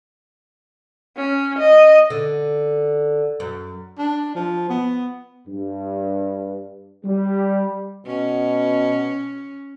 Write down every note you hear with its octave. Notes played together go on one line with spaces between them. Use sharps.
C#4
D#5
D3
F#2
D4
F3
B3
G2
G3
B2 C#4